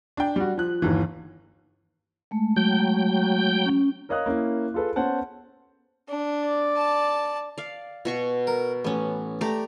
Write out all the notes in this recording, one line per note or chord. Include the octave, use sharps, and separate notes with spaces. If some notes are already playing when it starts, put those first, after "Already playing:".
D4 G5
G3 F#4
F3 F#6
G1 D#2 E3
G#3 A3
F#3 G5 G6
C#4
A#4 C#5 D#5 F5 D#6 F#6
A#3 C#4 E4
F4 G#4 A4 B4
B3 C#4 C5 F#5 A5
D4
D5
A5
D5 F5
B2 F#4 C#6
A#4
A1 B3 C#4
A3 G4 D5 A#5